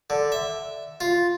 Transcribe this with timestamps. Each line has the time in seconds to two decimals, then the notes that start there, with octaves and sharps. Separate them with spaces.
0.10 D3
0.32 E5
1.01 F4